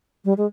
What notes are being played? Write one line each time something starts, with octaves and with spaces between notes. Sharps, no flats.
G3
G#3